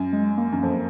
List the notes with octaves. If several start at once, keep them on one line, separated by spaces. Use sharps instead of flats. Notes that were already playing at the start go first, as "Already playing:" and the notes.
Already playing: F#2
G#3
A#3
F#2
F2